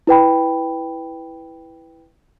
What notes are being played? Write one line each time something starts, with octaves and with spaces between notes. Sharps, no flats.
E4 B4 G5 B5